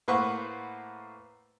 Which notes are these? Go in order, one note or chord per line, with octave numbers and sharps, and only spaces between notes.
A2 A#3 B4 C5 F#5 C#6